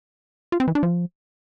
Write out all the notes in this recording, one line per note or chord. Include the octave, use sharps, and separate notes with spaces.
F4
C4
E3
D4
F3